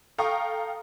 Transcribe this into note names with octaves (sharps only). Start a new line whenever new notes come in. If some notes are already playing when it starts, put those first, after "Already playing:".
A4 F5 G5 A#5 C#6 D#6